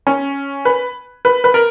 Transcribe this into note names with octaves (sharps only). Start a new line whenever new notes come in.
C#4
B4
B4
B4
A#4